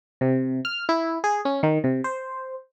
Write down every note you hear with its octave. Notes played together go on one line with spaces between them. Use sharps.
C3
F6
E4
G#4
C#4
D#3
C3
C5